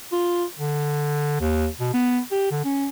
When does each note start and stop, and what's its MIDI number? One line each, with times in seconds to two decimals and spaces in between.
0.12 0.45 65
0.59 1.39 50
1.40 1.68 39
1.80 1.90 47
1.94 2.20 59
2.31 2.50 67
2.51 2.65 50
2.65 2.89 61